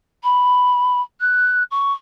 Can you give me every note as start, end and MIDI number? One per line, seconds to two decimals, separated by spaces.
0.24 1.01 83
1.20 1.63 90
1.71 1.93 85